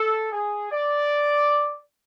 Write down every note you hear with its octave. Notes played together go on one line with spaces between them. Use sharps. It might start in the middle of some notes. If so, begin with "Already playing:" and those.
Already playing: A4
G#4
D5